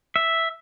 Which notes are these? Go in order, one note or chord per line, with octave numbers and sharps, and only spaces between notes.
E5